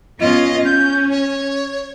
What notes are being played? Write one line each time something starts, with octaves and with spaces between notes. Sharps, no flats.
B3 C#4 F4 D#5
C#4 G6
C#5